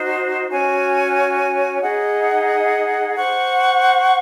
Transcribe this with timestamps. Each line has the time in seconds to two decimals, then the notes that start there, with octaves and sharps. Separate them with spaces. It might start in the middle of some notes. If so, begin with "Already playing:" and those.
Already playing: D#4 F#4 C5
0.50 C#4 F#4 C#5 G#5
1.82 D#4 G#4 D#5 F#5
3.15 C5 F#5 C#6